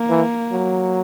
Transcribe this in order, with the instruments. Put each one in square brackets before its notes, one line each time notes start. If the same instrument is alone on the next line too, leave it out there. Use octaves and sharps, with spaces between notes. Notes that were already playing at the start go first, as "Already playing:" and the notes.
Already playing: [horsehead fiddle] A#3
[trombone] E3
F#3